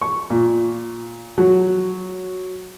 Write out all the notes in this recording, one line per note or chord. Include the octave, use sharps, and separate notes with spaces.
C#6
A#2
F#3